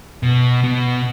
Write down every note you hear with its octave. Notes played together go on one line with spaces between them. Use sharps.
B2
B2